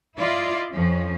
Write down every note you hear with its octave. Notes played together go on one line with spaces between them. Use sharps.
E4 F4 D5 D#5
F2 F3 C#4